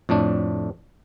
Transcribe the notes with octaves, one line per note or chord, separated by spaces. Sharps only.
F2 A2 A3 D4